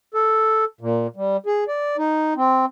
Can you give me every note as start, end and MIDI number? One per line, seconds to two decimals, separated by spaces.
0.14 0.65 69
0.81 1.07 46
1.16 1.37 55
1.46 1.64 68
1.68 1.97 74
1.98 2.34 63
2.36 2.65 60